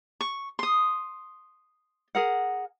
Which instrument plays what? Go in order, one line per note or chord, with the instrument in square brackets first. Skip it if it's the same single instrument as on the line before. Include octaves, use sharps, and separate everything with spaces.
[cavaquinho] C#6
C6 D#6
[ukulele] G#4 A#4 F#5